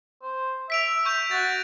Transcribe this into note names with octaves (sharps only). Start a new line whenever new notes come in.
C5
E5 B6 D7 F7
C#6 G6
F#4 A6